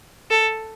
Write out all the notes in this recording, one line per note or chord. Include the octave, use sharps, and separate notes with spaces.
A4